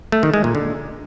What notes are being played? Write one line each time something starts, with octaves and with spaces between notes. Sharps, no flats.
A3
D#3
G#3
A#2
D3